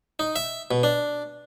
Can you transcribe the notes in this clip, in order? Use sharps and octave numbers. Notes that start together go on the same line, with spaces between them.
D#4
E5
B2
D4